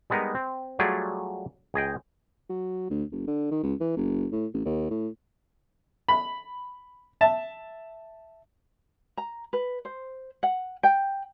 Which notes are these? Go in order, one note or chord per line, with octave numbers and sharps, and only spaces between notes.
G3 G#3 B3 D#4 A#4
C4
F#3 G3 A3 F4 G#4 D5
C#2 G#4 D#5 G5
F#3
D2
F#1
D3
D#3
C#2
E3
F#1
A2
A1
D#2
A2
B5
E5 A5
A#5
B4
C5
F#5
G5